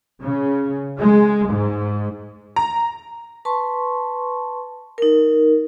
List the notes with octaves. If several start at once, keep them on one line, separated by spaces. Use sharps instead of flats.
C#3
G#3
G#2
A#5
B4 A5 C6 C#6
D#4 A#4